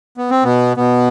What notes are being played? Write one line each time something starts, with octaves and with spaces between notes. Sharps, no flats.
B3
C4
B2 B3
B2 B3